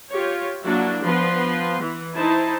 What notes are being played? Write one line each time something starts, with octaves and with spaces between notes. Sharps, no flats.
F4 G4 C#5
F#3 A#3 D4 E4 F#4
F3 B3 B4 C6
E3
D#4 E4 C5 A5